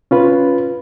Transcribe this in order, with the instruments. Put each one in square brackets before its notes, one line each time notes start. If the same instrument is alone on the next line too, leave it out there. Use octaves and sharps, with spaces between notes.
[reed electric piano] C#4 F4 B4